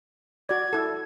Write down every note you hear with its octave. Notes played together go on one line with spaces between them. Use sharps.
F#4 D5 G#6
E4 A4